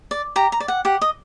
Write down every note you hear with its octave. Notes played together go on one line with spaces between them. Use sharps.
D5
G4 A#5
A#5
D5
F#5
G4 F#5
D#5